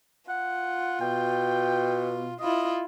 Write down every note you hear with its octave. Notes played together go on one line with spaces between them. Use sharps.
F4 F#5
B2 G5
E4 F4 D#5